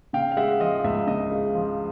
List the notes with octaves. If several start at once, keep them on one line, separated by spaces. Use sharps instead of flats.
C#3 F5 G5
F5
G#3 E5 F#5
F3 D#5 F5
C#2 E5
C#3 D#5
G#3
F3